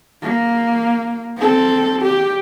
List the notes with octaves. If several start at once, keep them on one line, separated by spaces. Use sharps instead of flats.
A#3
C4 A4
G4